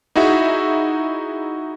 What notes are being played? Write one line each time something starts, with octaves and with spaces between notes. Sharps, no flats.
D#4 E4 F#4 G#4 E5